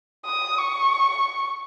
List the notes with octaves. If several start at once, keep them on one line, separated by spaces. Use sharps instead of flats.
D#6
C#6